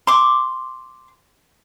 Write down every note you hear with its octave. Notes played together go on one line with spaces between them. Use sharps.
C6 D6